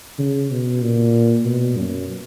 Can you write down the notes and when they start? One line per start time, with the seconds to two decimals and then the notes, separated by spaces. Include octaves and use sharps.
0.19 C#3
0.50 B2
0.82 A#2
1.46 B2
1.77 F#2